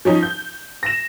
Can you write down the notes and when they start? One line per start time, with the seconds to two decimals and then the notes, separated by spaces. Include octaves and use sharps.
0.05 F3 C#4 D#4
0.23 G6
0.83 A#6 E7